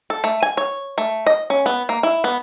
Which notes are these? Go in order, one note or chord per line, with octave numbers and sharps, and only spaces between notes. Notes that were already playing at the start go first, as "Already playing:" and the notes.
A4
A3
G#5
C#5
A3
D#5
C#4
B3
A#3
E4
B3